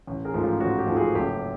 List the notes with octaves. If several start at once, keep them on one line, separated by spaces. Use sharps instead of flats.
A1
G#4 A#4
G#2 F3 A3
F4 G4
A1 F#4
F4 G4
G#2 F3 A3
F#4 G#4
F#1 G4 A4